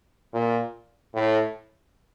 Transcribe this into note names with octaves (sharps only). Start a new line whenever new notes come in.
A#2
A2